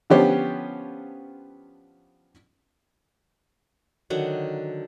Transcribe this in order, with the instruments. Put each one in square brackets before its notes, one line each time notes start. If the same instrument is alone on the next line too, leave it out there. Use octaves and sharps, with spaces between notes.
[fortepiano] D3 F3 B3 C#4 G4 C5
[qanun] D3 D#3 F#3 F#5